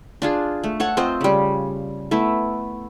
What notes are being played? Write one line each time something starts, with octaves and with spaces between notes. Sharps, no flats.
D4 F4 G#4
A3
A4 C#5 F#5
C4 F4 C5 D#5
C#3 G3
A3 B3 E4